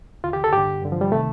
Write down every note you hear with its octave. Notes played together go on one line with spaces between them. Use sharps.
D#2 D3 F4
G4
A4
G2 D3 G4
G2 D3
F3
G3
C3 D#3 A3